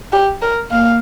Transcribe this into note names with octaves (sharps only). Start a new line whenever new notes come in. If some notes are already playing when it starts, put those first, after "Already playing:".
G4
A#4
A#3 F5